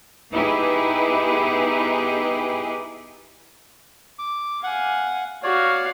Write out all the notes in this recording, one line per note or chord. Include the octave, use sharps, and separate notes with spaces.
B3 D#4 E4 G4 G#4 B4
D6
F5 F#5 G#5
F#4 C#5 D5 F5